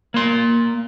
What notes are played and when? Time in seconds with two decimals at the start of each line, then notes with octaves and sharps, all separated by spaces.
0.14 A#3 C6